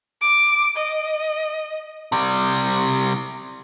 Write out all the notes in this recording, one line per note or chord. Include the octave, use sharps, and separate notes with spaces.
D6
D#5
C3 G3